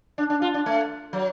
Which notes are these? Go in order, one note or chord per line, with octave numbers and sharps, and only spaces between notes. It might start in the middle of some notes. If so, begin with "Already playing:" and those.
D4
D4
F4
D4
A3
F#3